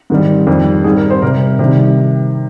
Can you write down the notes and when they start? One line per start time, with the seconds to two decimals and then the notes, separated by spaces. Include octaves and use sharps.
0.10 G#2 D#3 G3
0.47 F2 D#3 G3
0.84 G#2 G3 G#4
0.97 A#4
1.10 C5
1.22 C3 G3 A#4
1.59 C3 D#3 G3